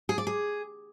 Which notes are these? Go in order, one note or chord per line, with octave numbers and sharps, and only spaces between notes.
G#4
D5
G#4